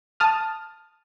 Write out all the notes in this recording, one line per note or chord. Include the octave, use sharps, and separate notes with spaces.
A5 D#6 F6